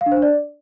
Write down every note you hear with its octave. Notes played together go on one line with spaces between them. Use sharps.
F5
D4
C5
D4
D5